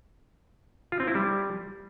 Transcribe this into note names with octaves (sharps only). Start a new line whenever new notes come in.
F4
C4
E4
G3